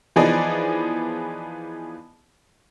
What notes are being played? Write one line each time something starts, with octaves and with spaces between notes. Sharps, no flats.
E3 F3 B3 D#4 G#4 D5